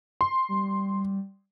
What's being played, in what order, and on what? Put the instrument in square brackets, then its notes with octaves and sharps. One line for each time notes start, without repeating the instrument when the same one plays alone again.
[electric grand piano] C6
[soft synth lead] G3